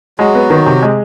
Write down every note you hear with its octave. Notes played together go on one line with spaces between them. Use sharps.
F#3 G#3 F#4
B3
D#3
C3
G#3